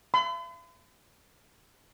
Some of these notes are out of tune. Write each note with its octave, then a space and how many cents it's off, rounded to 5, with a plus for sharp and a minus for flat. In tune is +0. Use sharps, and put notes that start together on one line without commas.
B5 +45